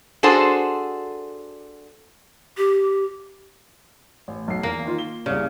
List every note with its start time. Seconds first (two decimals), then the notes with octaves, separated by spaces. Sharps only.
0.23 D4 F#4 G#4 A4 C5
2.57 G4
4.28 A1
4.48 B1 C7
4.63 E2 A#3
4.85 D#3 F4
4.98 G7
5.26 C2 C#3 D5